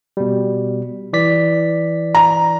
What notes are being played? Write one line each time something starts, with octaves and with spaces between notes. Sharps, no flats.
B2 G3
E3 D5 B6
A#5